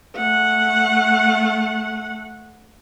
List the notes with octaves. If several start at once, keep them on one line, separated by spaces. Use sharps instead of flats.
A3 F#5